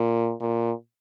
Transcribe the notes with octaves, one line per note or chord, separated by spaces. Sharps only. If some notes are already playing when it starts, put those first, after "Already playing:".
Already playing: A#2
A#2